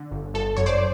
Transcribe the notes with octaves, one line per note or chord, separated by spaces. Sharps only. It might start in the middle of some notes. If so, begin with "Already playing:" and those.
Already playing: D3
G1
G1 A4
F#2 C#5
C5 D5